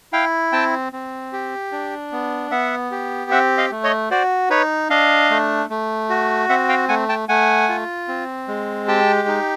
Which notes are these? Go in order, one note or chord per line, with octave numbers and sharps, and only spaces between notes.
E4 F5 G5
C4 G5 A5
C4
G4
D4
B3
B3 E5 F#5
G4
C4 E5 F#5
D#5 F5
A3
C#5 D#5
F#4 C5 D5
D#4 B4 C#5
D4 D#5 F5
A3
A3
F#4
C4 E5 F#5
F5 G5
A3 F#5 G#5
G5 A5
A3 F#5 G#5
F4
C4
G#3
G4 G5 A5
D#4